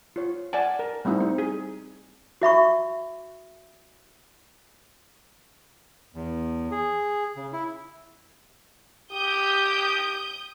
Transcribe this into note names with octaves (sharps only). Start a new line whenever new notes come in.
F4 C#5
D5 F#5 G#5 A5
A#4
G3 A3 C4 D#4 E4
C4
G#4
F#4 E5 B5 C#6
E2
G#4
C#3
E4
G4 D#6 G6